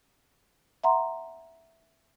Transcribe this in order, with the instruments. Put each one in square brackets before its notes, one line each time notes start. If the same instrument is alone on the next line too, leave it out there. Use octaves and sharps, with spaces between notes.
[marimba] E5 F#5 A#5 C6